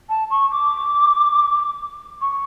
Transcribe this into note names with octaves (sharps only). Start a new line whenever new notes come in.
A5
C#6
D6
C#6